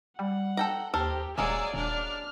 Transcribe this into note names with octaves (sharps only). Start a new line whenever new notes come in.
G3 F#5
A4 G5 A#5
D#2 G4 A4 A#4 C5
D#1 F#3 G#3 A#3 G#4 D5 E6
D#1 D4 D5 F6